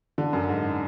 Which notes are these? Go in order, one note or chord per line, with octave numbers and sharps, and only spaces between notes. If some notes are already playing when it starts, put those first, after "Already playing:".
D3
F#2
G#2